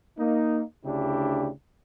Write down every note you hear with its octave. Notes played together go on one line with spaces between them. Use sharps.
A#3 D#4
D2 C#3 D4 E4 G4